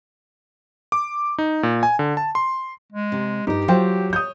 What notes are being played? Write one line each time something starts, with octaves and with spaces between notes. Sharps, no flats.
D6
D#4
A#2
G#5
D3
A5
C6
G#3
C3
G2 D#4 G4 A#4
F#3 F4 C5 G5
C#5 D#6 G6